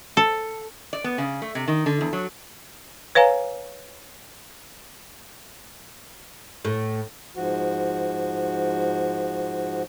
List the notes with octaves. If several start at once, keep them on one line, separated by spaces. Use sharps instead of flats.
A4
D5
B3
C#3
A3
C3
D#3
D3
E2
F#3
B4 C#5 F5 G#5 A#5
A2
G#2 F3 F#4